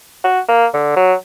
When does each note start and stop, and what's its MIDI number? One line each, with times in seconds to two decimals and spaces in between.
0.24 0.40 66
0.48 0.66 58
0.73 0.95 50
0.96 1.14 54